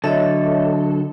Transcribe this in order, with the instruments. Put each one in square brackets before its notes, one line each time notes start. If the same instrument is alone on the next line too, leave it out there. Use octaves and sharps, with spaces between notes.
[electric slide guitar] D3 F#3 A4 [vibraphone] C#5 D#5 E5